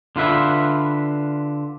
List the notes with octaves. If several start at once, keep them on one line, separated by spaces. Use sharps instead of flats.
D3 F4 B4 E5